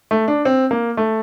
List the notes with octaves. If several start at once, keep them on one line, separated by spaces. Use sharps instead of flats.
A3
D4
C4
A#3
A3